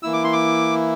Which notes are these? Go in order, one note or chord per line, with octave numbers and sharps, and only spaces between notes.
E3 A#3 E4 E6
D6
C6
D6